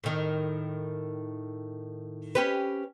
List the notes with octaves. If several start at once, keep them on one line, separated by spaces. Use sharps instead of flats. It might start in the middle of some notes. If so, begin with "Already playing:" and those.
A2 D#3
C#4 G4 B4